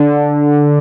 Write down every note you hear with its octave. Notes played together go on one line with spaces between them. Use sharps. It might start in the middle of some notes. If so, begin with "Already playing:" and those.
Already playing: D3